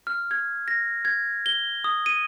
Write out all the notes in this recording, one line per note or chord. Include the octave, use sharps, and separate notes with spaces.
F6
G#6
A#6
G#6
G7
D#6
D#7